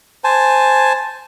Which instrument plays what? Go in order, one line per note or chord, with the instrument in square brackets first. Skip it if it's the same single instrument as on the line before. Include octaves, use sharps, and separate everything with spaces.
[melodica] C5 G#5 A5